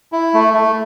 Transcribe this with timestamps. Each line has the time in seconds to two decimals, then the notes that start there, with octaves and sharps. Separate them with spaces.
0.12 E4
0.34 A3
0.54 A3